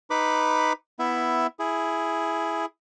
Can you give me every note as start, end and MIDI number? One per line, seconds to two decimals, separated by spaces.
0.10 0.73 63
0.10 0.73 71
0.10 0.73 83
0.10 0.73 86
0.99 1.47 59
0.99 1.47 64
0.99 1.47 76
1.59 2.66 64
1.59 2.66 68